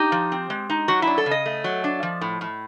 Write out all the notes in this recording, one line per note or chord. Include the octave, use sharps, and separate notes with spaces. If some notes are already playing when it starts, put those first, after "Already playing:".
Already playing: D#4 G4
F3
C4
G#3
D#4
F#3 F#4
D4 E4
A4
C#3
D#5
A3
F#3
D4
F3
A2
A2